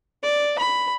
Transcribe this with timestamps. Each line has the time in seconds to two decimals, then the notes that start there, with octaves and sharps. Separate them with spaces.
0.23 D5
0.59 B5